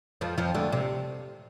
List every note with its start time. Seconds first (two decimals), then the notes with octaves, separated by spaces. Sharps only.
0.21 F2 F3
0.38 F2 F3
0.54 D2 D3
0.72 C3